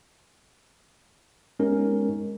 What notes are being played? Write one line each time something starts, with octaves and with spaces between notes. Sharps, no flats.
G#3 B3 C#4 D#4 G4 A#4